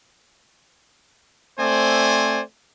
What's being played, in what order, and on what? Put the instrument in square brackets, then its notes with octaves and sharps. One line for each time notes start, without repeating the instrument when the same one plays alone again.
[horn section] A3 C4 C5 D5 G#5